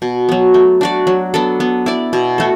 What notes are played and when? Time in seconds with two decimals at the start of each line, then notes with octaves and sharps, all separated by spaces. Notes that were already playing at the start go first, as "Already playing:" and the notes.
0.02 B2
0.29 F#3 B3
0.54 A3
0.81 D4 F#4 D5
1.07 F#3
1.34 B3 D4 A4
1.60 B3
1.86 E4 D5
2.13 B2
2.38 A3 F#4 A4